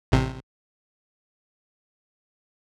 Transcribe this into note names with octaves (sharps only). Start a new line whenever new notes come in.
A1 C3